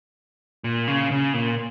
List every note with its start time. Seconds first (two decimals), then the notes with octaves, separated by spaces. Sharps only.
0.64 A#2
0.87 C#3
1.11 C#3
1.34 A#2